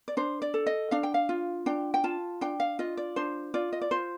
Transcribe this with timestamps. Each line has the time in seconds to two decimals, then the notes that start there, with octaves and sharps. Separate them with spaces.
0.08 D5
0.17 D4 C5
0.42 D5
0.54 A4
0.66 D#5
0.91 D4 F5
1.03 G5
1.14 F5
1.29 F4
1.66 D4 G5
1.94 G5
2.04 F4 A5
2.41 D4 G5
2.60 F5
2.79 F4 D#5
2.97 D5
3.16 D4 C5
3.54 F4 D5
3.73 D#5
3.81 D5
3.91 F4 C5